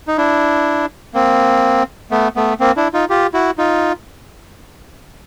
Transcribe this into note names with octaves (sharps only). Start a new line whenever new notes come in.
D#4
D4 E4
A#3 C4
A3 B3
A3 B3
A#3 C4
D4 E4
D#4 F4
F4 G4
E4 F#4
D#4 F4